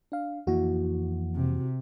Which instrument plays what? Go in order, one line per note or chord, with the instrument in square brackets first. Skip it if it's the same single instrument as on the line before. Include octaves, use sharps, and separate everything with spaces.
[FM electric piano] D4 F5
[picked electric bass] F2 E3 A#3 [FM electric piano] E4 F#4
[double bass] C3